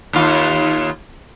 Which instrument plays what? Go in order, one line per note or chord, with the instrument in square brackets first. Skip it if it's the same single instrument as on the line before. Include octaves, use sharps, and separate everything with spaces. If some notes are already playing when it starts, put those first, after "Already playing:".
[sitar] D#2 F4